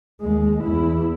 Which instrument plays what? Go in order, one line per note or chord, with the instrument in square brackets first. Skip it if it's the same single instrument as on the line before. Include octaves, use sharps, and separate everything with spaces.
[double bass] D#2 G#3
E2 E4